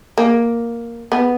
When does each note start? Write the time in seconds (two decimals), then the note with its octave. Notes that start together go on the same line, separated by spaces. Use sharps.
0.18 A#3
1.12 B3